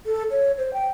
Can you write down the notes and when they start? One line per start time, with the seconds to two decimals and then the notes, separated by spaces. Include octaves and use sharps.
0.06 A4
0.31 C#5
0.58 C5
0.73 G5